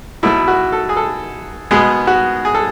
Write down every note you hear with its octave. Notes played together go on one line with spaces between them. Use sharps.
B2 F#3 A3 E4
F#4
A4
G#4
A4
B2 G#3 B3 G#4
F#4
G#4
A4